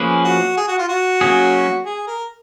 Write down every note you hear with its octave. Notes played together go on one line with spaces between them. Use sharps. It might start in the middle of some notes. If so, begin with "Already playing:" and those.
Already playing: F3 A#3 C#4 G#4 B4
F#4
G#4
F#4
F4
F#4
F#3 A#3 C#4 G#4
G#4
A#4